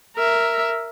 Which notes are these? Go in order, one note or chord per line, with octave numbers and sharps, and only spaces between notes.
A#4 E5